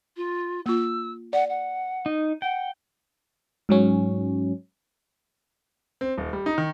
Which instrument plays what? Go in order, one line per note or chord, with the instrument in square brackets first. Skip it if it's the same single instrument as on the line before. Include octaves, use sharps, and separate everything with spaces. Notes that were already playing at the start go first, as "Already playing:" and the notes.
[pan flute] F4
[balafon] A#3 F4 [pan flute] E6
[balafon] D5 [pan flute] F#5
[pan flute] F#5
[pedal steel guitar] D#4
[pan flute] F#5 [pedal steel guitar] G5
[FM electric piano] G#2 F#3 C#4
[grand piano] C4
D#1
G3
D#4
D#3